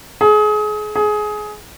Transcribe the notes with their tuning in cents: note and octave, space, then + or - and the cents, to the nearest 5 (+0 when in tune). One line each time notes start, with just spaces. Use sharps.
G#4 +30
G#4 +20